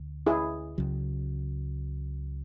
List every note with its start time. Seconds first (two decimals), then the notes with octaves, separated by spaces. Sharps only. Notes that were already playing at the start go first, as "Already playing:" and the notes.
Already playing: D2 D3
0.26 E4 G#4
0.78 C#2 C#3 F#3